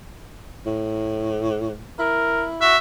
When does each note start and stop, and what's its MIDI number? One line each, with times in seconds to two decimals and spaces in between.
0.66 1.82 45
1.99 2.75 64
1.99 2.45 70
2.62 2.76 66
2.62 2.78 76